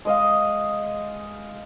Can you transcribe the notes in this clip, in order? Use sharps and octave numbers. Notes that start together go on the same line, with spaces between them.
G#3 D#5 F5